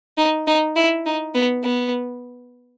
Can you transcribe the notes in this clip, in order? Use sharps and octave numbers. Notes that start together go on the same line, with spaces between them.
D#4
D#4
E4
D#4
B3
B3